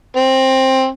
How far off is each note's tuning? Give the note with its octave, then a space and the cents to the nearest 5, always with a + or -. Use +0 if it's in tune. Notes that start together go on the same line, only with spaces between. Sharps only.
C4 +15